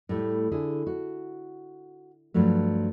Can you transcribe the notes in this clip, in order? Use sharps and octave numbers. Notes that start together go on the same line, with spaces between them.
A2 G3 A3 E4
D3 E4 G#4
F#4
G2 F3 F#3 A3